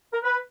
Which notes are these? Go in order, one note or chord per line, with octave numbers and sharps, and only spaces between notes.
A#4
B4